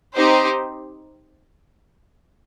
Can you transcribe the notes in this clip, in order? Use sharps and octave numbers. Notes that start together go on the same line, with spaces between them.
C4 D#4 G4 C5